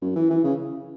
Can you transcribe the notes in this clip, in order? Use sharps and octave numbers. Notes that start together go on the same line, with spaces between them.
F#2
E3
E3
C#3